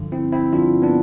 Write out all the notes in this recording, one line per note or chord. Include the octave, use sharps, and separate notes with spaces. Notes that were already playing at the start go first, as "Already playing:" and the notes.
Already playing: G2 D3 F3
C4 E4
C4 E4
G2 D3 F3 D4 F4
B3 D4